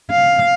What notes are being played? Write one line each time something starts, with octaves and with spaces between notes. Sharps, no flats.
F5